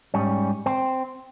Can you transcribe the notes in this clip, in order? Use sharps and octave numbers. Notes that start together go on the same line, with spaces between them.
G#2 G3 C#4
C4